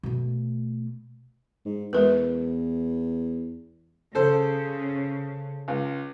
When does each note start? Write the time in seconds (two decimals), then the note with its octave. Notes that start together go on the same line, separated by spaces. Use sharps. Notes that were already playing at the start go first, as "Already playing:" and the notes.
0.03 B2 A3
1.65 G#2
1.93 E2 G#3 A#4 B4
4.15 C#3 A4 C5
5.68 C#2